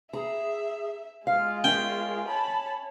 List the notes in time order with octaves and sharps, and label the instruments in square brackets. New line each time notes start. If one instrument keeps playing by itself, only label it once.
[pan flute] G#4 [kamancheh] E5 [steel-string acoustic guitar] A#5
[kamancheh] G#3 F4 [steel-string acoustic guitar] F5 [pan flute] F6
[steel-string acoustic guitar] C#4 E5 [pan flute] A#4 [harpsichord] G5
[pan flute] C#5 [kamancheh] A5 B5